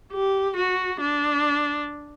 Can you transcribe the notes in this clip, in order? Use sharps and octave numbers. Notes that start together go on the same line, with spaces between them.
G4
F#4
D4